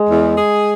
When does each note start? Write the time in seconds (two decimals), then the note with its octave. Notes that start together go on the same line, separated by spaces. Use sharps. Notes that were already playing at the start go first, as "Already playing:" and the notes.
Already playing: G#3
0.10 E2
0.37 G#4